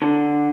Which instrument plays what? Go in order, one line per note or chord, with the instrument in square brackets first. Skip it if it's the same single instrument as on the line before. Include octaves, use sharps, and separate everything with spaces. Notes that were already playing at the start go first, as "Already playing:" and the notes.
[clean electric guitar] D3